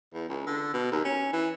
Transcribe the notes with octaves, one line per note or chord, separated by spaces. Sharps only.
E2
C#2
D3
B2
D#2
C#4
E3